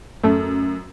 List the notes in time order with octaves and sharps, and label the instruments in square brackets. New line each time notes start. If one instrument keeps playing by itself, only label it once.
[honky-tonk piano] F#2 [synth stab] A3